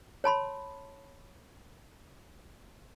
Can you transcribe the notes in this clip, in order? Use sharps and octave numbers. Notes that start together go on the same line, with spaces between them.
C#5 A5 B5 C6